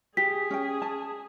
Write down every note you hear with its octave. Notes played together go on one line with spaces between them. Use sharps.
G4 G#4 B6
C#4 G5
A5